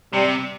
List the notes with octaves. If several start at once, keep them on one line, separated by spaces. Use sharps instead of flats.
C3 G3